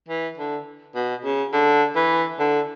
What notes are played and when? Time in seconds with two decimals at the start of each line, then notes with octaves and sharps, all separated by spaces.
0.09 E3
0.38 D3
0.95 B2
1.24 C#3
1.53 D3
1.96 E3
2.40 D3